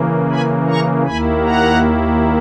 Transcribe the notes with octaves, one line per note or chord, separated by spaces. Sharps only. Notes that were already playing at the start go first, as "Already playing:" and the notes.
Already playing: C#3 E3 A#3
G#5 B5
A#5 C#6
D#2 D#3 A#3 E4 G#5 B5
F#5 A#5